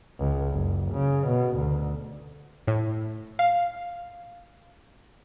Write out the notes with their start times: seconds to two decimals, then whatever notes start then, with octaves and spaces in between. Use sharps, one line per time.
0.19 C#2
0.52 F#1
0.93 C#3
1.28 B2
1.58 D2
2.67 A2
3.39 F5